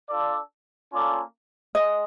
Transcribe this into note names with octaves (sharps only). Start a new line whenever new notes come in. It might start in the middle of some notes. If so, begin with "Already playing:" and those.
D4 F4 A4 D5
A#3 C#4 F4 A4 D5
G#3 D#5